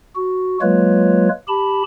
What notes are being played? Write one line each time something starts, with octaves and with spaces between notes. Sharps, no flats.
F#4
F#3 G#3 A#3 F4 B4 C#5
G4 A5 B5